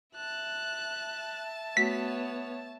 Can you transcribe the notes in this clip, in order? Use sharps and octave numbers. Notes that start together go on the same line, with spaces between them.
E5 A5 F#6
A3 B3 F#4 C#5 B6